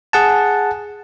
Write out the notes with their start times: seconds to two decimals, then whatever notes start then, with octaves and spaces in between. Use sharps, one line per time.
0.13 G#4 F#5 A5